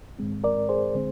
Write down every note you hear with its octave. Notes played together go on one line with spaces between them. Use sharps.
G#2 D#3 G#3 C4
A#4 D5
G#4 C5
D3 G#3 C4